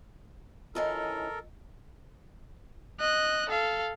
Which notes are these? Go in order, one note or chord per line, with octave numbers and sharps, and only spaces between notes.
E3 C#4 D#4 F4 A4 A#4 D#5 G5
D#5 F#6
A4 F5